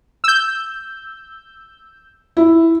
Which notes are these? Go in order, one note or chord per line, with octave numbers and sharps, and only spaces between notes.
E6 G6
E4